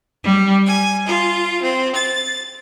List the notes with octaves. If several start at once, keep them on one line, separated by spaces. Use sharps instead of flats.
G3
G#5
F4
C4
A6